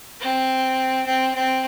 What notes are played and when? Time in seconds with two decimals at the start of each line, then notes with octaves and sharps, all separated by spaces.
0.20 C4
1.05 C4
1.34 C4